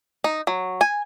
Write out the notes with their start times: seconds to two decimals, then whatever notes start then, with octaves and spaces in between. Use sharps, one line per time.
0.24 D#4
0.47 F#3
0.81 G#5